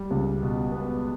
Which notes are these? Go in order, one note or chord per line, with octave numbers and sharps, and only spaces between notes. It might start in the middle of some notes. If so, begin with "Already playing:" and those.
Already playing: G3
C#2
B2
B3